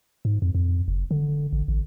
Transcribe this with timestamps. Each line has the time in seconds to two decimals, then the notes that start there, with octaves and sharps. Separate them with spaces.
0.25 G#2
0.42 F2
0.55 F2
0.88 F#1
1.11 D3
1.53 A1
1.68 A1